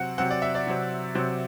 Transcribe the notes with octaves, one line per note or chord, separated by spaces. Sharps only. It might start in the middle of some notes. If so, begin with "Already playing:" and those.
Already playing: C3 F#3 C4 F#5
C3 F#3 C4 F#5
D5
E5
D5
C3 F#3 C4
C3 F#3 C4